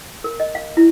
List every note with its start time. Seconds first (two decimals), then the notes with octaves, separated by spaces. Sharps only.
0.24 A#4
0.40 D#5
0.55 F5
0.77 E4